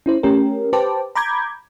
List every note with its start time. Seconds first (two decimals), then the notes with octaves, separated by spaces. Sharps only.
0.06 C#4 E4 C5
0.23 A3 C#4 G4 A#4
0.73 G4 B4 C5 G5 A5 D6
1.15 A#5 B5 D6 G6 G#6